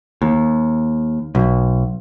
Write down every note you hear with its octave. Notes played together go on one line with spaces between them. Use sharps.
D#2
B1